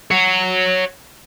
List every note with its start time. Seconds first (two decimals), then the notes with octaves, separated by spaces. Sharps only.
0.11 C#5 F#5